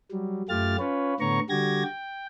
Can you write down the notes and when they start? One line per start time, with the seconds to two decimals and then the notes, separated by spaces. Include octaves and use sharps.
0.11 F#3 G3
0.49 F#2 A3 F4 G4 F6 A6
0.79 C#4 F4 B4 C#5
1.20 A2 D3 B3 C#5 A#5 C#6
1.50 D3 G3 F#4 G4 G#6 A#6
1.84 G5